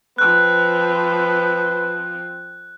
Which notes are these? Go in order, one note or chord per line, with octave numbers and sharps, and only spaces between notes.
F3 C4 B4 F#6